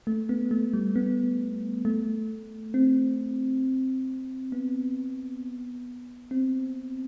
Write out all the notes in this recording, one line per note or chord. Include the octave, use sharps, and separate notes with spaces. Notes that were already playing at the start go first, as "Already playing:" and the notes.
A3
B3
A3
G3
B3
A3
C4
B3
C4